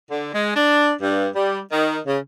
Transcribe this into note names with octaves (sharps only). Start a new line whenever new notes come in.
D3
G#3
D4
G2
G3
D#3
C#3